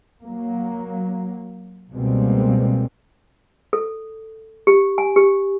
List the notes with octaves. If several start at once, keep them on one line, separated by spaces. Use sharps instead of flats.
F#3 A#3
C#2 B2 G3 G#3 A#3 C4
A4
G4
G#5
G4